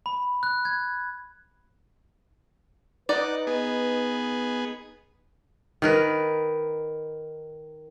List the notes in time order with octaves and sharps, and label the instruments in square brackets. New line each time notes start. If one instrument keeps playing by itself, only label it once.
[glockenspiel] B5
F#6
G#6
[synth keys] D#4 D#5 [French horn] B4 [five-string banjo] D5 [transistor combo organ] F#5
[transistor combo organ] B3 G#4
[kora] D#3 A#4 B4